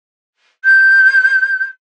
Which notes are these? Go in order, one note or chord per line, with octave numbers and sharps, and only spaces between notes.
G6